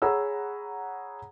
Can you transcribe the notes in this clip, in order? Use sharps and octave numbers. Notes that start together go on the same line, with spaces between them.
G#4 C#5 F#5 A#5 B5 E6